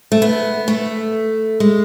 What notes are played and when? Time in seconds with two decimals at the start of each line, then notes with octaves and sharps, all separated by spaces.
0.12 A3
0.22 B3
0.68 A3
1.60 G#3